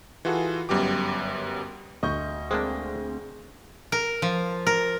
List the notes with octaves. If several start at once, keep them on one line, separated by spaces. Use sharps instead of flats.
E3 F4 F#4 G#4 A4
G1 F#2 G3 B3 G4 D6
D2 D#5 C#6 G6
G#3 A#3 C4 D4 G#4
A#4
F3
A#4